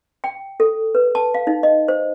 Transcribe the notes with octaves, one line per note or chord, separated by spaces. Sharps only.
G5
A4
B4
A5
F5
D#4
D#5
C5